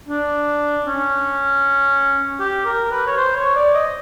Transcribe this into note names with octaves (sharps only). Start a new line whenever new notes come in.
D4
C#4
G4
A#4
B4
C#5
C5
C#5
D5
D#5